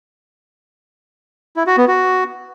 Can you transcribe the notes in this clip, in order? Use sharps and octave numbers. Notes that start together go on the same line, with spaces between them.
E4
F#4
B3
F#4